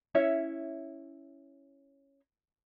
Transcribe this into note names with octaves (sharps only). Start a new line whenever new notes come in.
C#4 E4 C#5 E5